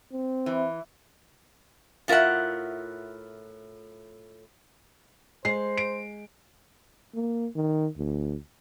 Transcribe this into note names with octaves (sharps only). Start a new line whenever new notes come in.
C4
E3
A2 F4 A#4 E5 F#5
G#3 C5 C7
D7
A#3
D#3
D2